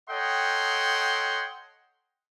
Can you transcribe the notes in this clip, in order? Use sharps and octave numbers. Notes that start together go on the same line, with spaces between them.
A4 C#5 D#5 F#5 G5 C6